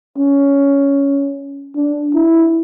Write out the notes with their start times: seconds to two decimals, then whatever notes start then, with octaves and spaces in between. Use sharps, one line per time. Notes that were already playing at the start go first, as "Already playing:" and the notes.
0.18 C#4
1.76 D4
2.15 E4